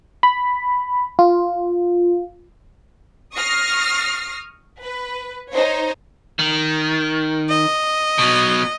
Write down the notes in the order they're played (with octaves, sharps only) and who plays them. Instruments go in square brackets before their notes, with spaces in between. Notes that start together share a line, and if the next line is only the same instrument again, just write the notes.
[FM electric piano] B5
F4
[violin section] C#6 D#6 F6 A#6 C7
B4
D#4 C5 C#5
[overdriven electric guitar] D#3
[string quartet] D#5
[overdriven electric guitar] B2 F#3